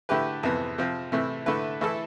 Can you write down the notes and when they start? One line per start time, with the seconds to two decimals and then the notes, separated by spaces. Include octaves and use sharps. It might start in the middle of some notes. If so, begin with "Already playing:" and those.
0.09 D3 A3 E4 G4 B4
0.43 F2 C3 E3 B3
0.78 C3 F3 C4
1.12 C3 E3 A3 E4
1.46 D3 A3 E4 B4
1.81 E3 A3 E4 A4